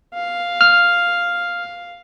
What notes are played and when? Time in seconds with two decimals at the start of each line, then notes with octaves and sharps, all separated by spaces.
0.14 F5
0.61 F6